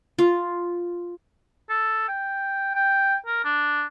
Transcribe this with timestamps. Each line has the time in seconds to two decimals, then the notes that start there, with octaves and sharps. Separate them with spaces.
0.19 F4
1.69 A4
2.08 G5
2.75 G5
3.26 A#4
3.44 D4